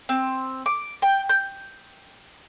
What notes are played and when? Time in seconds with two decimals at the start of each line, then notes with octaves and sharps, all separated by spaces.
0.09 C4
0.66 D6
1.02 G5
1.29 G6